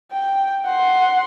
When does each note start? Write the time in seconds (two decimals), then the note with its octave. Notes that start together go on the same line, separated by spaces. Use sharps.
0.11 G5
0.65 F#5 C6